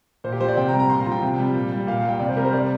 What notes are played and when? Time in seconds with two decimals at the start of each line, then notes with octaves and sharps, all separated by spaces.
0.24 A#2 C5
0.32 G4
0.40 F3 C5
0.49 D5
0.57 C3 G5
0.68 A#5
0.74 G3
0.80 A#5
0.90 A#2 C6
1.01 A#5
1.06 F3
1.12 G5
1.22 C3
1.39 G3
1.55 A#2
1.71 G3
1.87 A#2 F5
2.03 G3
2.09 G5
2.20 C3 D5
2.29 C5
2.37 G3 A#4
2.45 C5
2.52 C3 D5